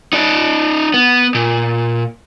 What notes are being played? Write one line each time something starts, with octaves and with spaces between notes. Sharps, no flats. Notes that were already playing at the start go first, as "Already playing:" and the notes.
D#4 D5
B3
A#2